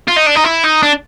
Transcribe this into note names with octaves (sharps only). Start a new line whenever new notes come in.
F4
D#4
D4
D#4
E4
D#4
D4